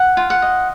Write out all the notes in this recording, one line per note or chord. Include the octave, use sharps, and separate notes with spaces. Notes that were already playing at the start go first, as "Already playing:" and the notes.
Already playing: F#5
F4
F#5
D#5